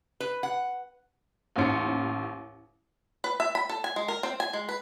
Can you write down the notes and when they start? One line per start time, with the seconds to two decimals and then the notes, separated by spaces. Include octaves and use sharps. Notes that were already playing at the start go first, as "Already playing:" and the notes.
0.20 B4
0.43 F#5
1.56 A1 D#2 C#4 C5 C#7
3.24 B4
3.40 E5
3.55 B5
3.69 A4
3.84 G#5
3.96 G#3
4.08 A#4
4.23 C4
4.40 G#5
4.53 G#3
4.69 B4